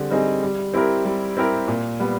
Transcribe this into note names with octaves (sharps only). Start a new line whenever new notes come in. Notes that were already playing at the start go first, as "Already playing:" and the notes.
Already playing: D3 G3 C4 G#4
G3 C4 D#4 G#4
G3
C4 E4 G4 A#4
G3
C4 E4 G4 A#4
A#2
G3 B3